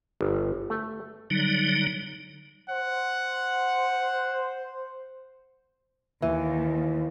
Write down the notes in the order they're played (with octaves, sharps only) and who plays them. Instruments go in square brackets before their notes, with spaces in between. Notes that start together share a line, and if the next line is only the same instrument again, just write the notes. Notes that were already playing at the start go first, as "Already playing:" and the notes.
[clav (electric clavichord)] G1
A3
[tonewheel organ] D3 F#3 G3 D#4
[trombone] C5 [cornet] F#5
[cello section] D#2 [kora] E3